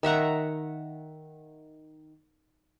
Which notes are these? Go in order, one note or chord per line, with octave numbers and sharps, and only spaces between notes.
D#3 E5 F#5 A#5